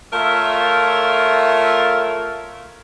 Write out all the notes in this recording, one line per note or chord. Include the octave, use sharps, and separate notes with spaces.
A3 F4 A#4 C#5 E5